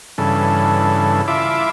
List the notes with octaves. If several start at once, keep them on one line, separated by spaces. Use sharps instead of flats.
G2 C#3 E3 A4
E4 F4 E5 D6